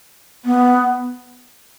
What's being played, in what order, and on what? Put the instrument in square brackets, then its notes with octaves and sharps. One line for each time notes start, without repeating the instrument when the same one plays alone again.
[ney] B3